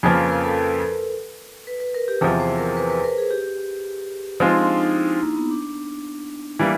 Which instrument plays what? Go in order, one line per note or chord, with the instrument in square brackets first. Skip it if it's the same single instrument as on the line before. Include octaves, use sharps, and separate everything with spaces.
[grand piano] F2 C#3 F3 A#3 [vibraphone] B4
[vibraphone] B4
A#4
A4
B4
B4
A#4
G4
[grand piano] E2 C3 F3 [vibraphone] G#4
[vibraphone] C5
A#4
B4
B4
A#4
G#4
G4
[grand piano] F3 G#3 C4 F4 [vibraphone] D#4
[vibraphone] D4
D#4
E4
D#4
A#3
B3
D4
[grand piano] E3 G3 A#3